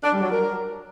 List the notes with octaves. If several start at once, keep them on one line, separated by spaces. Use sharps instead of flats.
D4
G3
F#3
A#4